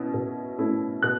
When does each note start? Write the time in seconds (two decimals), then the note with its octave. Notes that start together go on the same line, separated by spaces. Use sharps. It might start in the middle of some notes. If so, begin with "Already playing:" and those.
Already playing: B2 C#4 E4
0.14 B2
0.59 A3 C#4 E4
1.03 B2 F#6